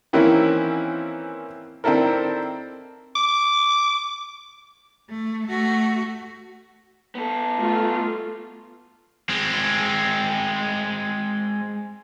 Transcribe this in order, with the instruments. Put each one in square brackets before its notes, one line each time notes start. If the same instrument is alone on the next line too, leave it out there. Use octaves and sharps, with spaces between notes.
[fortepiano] D#3 E3 A#3 C4 C#4 E4
D#3 C4 D4 E4 A4 A#4
[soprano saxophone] D6
[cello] A3
A3 F#4
[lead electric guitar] B3 A4
[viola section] A3 F4
[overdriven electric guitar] G#3 C4